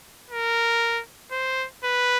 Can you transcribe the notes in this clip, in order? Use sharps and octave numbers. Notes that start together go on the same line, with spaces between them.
A#4
C5
B4